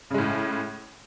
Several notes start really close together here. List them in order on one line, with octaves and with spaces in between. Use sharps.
C#3 G#3 A2